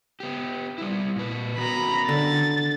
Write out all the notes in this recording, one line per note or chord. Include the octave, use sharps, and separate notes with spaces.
B3 G4
G3 E4
A#2 B4
D#3 B3 F#4 A#5 B5
D3 A6